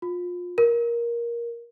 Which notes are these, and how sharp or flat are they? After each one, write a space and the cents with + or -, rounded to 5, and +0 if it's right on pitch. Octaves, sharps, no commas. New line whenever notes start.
F4 +25
A#4 +15